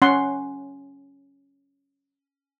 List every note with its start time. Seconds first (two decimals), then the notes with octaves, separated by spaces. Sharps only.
0.02 C#4 F#5 C6